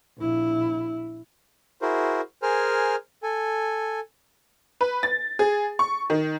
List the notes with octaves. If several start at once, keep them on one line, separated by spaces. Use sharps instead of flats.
A#1 E4
E4 F#4 G#4 A#4 C5
G#4 A#4 C5 G#5 F6
A4 G#5
B4
A6
G#4
C#6
D#3